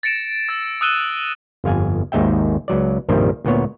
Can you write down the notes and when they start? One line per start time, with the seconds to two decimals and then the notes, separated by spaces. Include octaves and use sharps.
0.03 A6 A#6 C#7 D7 E7
0.49 E6 A6
0.81 D#6 E6 F#6 D#7 E7 G7
1.64 G1 F2 F5 G#5
2.12 G#1 D#2 G#2 D#4 E5 G5
2.68 C#2 F#3 D5
3.08 C2 G2 A#2 D#3 F3 G3
3.45 D2 A#2 B3 C#5